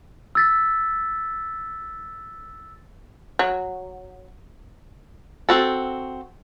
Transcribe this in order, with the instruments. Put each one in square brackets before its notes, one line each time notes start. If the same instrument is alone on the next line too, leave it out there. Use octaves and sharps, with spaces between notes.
[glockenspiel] E6 A6 B6
[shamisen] F#3
[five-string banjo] C4 F#4 A4